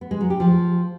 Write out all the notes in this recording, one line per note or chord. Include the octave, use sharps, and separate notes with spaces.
B3
G#3
F#3
G4
F3